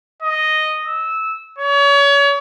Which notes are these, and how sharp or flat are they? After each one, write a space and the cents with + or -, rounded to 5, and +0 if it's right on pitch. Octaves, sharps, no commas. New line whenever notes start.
D#5 -5
E6 -15
C#5 +35